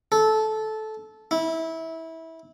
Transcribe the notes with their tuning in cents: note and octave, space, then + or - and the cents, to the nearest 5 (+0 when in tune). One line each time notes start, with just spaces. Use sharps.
A4 -15
E4 -20